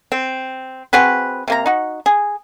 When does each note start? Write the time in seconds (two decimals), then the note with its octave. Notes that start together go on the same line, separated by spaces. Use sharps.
0.12 C4
0.93 C4 F#4 G#4 B4
1.48 C3 A#3 A#5
1.66 D#4 F#4
2.06 G#4